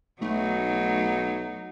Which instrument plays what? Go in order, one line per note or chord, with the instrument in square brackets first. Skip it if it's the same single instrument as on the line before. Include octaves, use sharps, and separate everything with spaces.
[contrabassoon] B1 [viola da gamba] F#3 D#4 [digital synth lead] A3